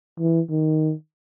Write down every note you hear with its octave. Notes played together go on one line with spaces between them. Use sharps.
E3
D#3